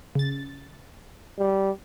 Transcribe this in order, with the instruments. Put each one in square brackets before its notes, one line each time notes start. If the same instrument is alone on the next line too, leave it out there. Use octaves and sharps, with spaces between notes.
[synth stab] C#3 A6
[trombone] G3